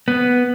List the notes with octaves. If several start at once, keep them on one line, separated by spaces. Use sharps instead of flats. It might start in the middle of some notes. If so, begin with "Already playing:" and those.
B3